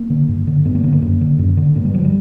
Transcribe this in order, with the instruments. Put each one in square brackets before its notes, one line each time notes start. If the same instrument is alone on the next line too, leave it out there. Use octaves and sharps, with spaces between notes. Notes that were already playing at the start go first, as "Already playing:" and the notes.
Already playing: [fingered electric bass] A#3
D3
G2
D3
G2 B3
A#3
D3 B3
A#3
F#2
D3
F#2
D3
G2 A#3
G3
D3 F#3
G3